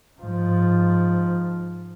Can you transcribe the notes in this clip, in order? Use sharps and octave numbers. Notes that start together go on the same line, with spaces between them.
G#2 F3